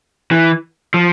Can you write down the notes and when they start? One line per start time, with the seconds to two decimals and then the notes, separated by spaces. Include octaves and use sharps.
0.31 E3
0.94 F3